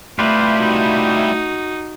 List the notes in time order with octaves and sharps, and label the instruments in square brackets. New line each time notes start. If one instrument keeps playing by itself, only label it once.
[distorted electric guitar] G3 E4 [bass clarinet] A3 [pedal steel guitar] F4 G4 B4
[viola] D#4 F#4